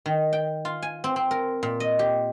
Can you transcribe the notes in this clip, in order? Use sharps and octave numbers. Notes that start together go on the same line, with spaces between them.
D#3
G5
F4
G#5
C4
C4
A#4
A#2
D#5
G4